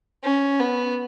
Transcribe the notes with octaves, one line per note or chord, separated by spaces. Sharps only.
C#4
B3